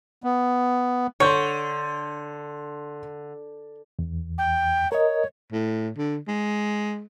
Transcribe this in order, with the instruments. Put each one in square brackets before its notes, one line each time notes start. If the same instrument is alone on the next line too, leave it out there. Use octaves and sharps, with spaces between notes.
[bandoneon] B3
[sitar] D3 [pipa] C#5 [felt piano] C6 G6 C#7
[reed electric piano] E2
[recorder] G5
[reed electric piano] A#4 D#5 [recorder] C#5
[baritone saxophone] A2
D3
G#3